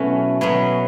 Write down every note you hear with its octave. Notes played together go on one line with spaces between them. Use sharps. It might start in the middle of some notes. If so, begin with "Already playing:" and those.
Already playing: B2 F#3 A3 C#4 E4 F#4 A4
B2 F#3 B3